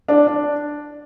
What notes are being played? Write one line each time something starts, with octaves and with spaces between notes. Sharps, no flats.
D4
D4